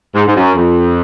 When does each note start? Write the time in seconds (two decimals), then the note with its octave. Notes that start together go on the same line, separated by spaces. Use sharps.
0.14 G#2
0.27 G#2
0.36 F#2
0.56 F2